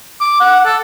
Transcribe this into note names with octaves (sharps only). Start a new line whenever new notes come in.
D6
F#5
A4